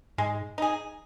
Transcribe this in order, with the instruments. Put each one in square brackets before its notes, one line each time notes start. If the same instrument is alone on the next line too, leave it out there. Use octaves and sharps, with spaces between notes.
[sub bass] G#2 [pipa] G#3
[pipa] D#4 G#4